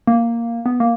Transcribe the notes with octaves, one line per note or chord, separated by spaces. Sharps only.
A#3
B3
A#3